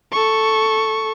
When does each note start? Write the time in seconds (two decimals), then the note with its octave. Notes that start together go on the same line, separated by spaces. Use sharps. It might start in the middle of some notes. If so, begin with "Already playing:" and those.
0.12 A4 C#6